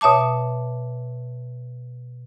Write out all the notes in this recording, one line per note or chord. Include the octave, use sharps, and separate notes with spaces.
B2 C#5 E5 A5 D6